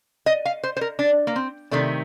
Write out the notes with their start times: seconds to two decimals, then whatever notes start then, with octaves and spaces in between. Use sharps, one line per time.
0.26 D#5
0.45 F5
0.64 C5
0.77 C5
0.81 A#4
0.99 D4
1.27 A#3
1.36 C4
1.71 C3 D#3 A3 D4